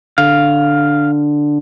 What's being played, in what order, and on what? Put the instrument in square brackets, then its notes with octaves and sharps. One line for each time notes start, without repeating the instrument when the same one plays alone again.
[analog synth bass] D3 [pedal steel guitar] F5